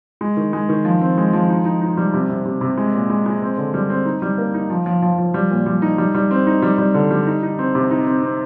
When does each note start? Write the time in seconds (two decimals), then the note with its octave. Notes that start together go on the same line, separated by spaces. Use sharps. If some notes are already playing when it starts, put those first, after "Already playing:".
0.21 G#3
0.37 D#3
0.53 G#3
0.69 D#3
0.85 F3
1.01 C4
1.18 G#3
1.33 F3
1.49 D#4
1.65 D#4
1.81 D#4
1.97 G3
2.13 C3
2.29 C3
2.45 C3
2.61 C3
2.77 G#3
2.94 A#2
3.10 G#3
3.26 G#3
3.42 C4
3.57 D3
3.74 G3
3.90 C4
4.06 D#4
4.22 G3
4.38 A#3
4.54 D#4
4.70 F3
4.86 F3
5.02 F3
5.18 F3
5.34 G3
5.50 A#2
5.66 G3
5.82 D#4
5.98 G3
6.15 G3
6.31 C4
6.47 D#4
6.62 G3
6.78 G3
6.94 D3
7.11 G3
7.27 D#4
7.43 D#4
7.59 C4
7.75 C3
7.91 D#4
8.07 C4
8.23 C4